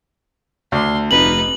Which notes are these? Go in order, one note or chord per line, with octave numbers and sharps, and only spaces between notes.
D2 C6
F1 D#4 B4 F#7